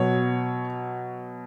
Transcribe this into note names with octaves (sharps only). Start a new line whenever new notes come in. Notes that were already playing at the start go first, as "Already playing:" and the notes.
Already playing: B2 F#3 C#5